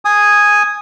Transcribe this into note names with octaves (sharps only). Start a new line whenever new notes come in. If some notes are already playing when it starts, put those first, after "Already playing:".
G#5 D#6